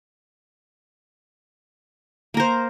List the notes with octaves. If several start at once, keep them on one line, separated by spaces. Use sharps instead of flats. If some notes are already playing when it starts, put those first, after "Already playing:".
A#3 A#4 C5